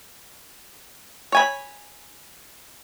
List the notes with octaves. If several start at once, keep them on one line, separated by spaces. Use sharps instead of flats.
C#5 G#5 B5